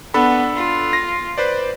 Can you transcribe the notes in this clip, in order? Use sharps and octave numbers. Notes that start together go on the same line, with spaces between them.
B3 D4 A4 B5
F4
A#6
B4 C5 D5